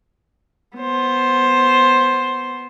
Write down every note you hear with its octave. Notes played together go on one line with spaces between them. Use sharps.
B3 C5